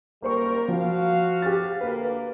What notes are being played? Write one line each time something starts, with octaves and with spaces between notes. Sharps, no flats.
F#1 G3 A#3 A#4 C5 C#6
F3 F#4 F5
G4 F6 A6
D2 A#3 B4